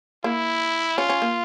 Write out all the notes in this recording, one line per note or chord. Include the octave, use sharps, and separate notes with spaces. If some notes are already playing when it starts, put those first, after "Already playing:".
A#3 E4
C#4 F4
C#4
A#3